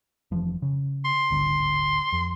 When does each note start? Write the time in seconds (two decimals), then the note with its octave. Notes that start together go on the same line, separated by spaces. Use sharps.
0.31 F1 E3 F3
0.62 C#3
1.05 C6
1.30 D1 G#1 D3
2.12 F2